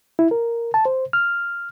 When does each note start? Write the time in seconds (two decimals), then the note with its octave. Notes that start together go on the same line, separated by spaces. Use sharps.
0.19 E4
0.31 A#4
0.74 A5
0.85 C5
1.13 F6